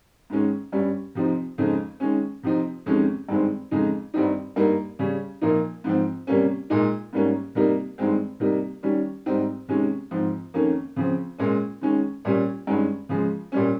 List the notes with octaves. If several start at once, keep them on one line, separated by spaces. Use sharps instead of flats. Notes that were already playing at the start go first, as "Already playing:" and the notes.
G#2 D#3 G#3 C#4
G2 G3 C#4
C3 F3 C4 D#4
F2 C#3 G#3 C4 D#4
D#3 G#3 C#4
C3 F3 C4 D#4
F2 C3 D#3 G#3 C#4
G2 D#3 G#3 C4
F2 C#3 G#3 D#4
G2 D#3 G3 C4 D#4
G2 G3 A#3 D#4
C#3 G3 C#4
A#2 F3 A#3 D#4
G#2 F3 C4
C3 G3 A#3 C#4
A#2 G#3 D#4
G#2 G3 A#3 C#4
C3 G3 A#3 D#4
G2 D#3 G#3 C4
C3 G3 A#3 D#4
D#3 G3 C#4
G#2 G3 C4 D#4
C3 D#3 G#3 C#4
G#2 F3 C4
F2 D#3 A#3 C#4
C#3 F3 C4
A#2 G#3 C#4
D#3 G#3 C#4
A#2 G3 C#4
G2 D#3 G#3 C#4
C#3 F3 G#3
A#2 G3 C#4